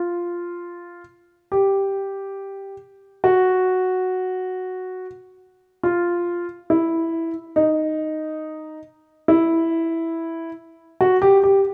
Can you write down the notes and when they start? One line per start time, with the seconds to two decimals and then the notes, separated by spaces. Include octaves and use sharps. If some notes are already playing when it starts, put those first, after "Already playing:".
Already playing: F4
1.52 G4
3.24 F#4
5.83 F4
6.70 E4
7.56 D#4
9.28 E4
11.01 F#4
11.22 G4
11.43 G4